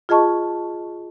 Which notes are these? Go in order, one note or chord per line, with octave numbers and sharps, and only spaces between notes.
F4 G#4 D#5 A5 C#6